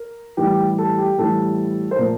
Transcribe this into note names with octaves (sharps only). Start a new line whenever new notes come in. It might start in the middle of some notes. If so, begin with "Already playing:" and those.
Already playing: A#4
A2 E3 G3 G4
G4
A4
G4
A2 E3 G3 A4
C5
A#2 F3 A3 A#4